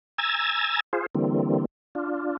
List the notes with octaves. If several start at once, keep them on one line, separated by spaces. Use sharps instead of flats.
G#5 A#5 E6 G#6 A6
F4 G#4 C5
D3 E3 G3 A#3 C4
D4 F4